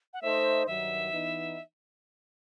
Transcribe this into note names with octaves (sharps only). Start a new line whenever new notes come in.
F#5
A3 D#4 A4 C5 D#5 E5
G2 D#3 F#3 E5
E3 B3 D#4